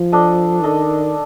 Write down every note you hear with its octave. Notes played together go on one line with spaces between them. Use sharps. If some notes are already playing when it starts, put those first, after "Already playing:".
Already playing: F3
D4 A4 D#5
D#3 D4 A4 D#5